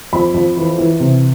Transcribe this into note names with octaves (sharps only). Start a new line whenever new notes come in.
F2 B5
F2
E3
E3
C3